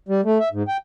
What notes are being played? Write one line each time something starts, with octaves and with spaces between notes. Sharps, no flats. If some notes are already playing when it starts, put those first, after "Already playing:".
G3
A3
E5
G#2
G5